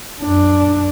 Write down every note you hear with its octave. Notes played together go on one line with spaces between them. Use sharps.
F#2 D4